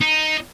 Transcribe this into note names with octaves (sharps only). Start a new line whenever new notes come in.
D#4